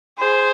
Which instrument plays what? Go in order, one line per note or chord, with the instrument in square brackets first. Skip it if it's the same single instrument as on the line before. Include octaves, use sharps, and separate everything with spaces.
[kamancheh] G#4 [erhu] C5